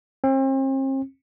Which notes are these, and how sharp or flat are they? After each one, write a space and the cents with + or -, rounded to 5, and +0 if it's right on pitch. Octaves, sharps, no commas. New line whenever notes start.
C4 +40